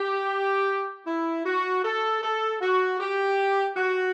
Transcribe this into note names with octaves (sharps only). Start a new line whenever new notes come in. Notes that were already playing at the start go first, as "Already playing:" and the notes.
Already playing: G4
E4
F#4
A4
A4
F#4
G4
F#4